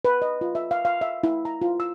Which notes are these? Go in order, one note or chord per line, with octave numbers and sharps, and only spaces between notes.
B4
D#5
F4
E5
F5
F5
E5
E4
A#5
F4
E6